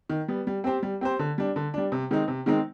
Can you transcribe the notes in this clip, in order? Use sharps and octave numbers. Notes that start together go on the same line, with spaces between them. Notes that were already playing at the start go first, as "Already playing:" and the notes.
D#3
G3 B3
G3
C4 G4 C5
G3
C4 G4 C5
D3
G3 D4
D3
G3 D4
C3
D#3 G#3 C4 D#4
C3
D#3 G#3 C4 D#4